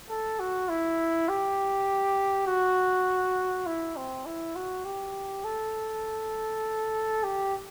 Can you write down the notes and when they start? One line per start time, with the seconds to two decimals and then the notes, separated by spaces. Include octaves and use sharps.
0.10 A4
0.40 F#4
0.69 E4
1.29 G4
2.48 F#4
3.67 E4
3.97 C4
4.26 E4
4.56 F#4
4.85 G4
5.44 A4
7.24 G4